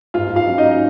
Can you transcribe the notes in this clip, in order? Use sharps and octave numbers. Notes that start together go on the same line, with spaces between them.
G#2 F4 F5
F4 F5
F#3 C#4 F4
D#4 D#5